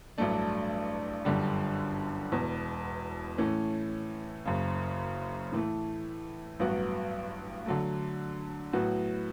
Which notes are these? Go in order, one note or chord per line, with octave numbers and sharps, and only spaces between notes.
A1 G2 F#3 A3 D4
G1 F#2 D3 G3
E1 E2 B2
A2 E3 A3 C#4
F#1 F#2 C#3
A2 E3 A3
A1 G2 F#3 B3 F#4
D3 F#3 A3
A2 F#3 B3 F#4